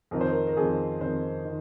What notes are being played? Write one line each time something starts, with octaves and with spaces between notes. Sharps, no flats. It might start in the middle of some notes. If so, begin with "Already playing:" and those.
F2 D#3 A#4
C5
A#4
A#4
F2 D#3 G#4
F2 D#3 C5
D#3